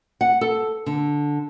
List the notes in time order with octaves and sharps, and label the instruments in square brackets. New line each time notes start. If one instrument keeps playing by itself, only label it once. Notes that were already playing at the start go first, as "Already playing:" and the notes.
[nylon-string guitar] F#5
A4
D3